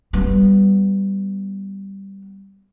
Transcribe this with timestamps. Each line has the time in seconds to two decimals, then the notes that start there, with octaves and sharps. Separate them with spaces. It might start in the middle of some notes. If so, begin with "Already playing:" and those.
0.13 G3 B3